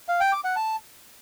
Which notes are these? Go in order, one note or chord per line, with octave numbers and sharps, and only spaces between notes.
F5
G5
D6
F#5
A5